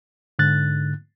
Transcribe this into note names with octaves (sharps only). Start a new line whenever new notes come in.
G#2 D3 F#6 A6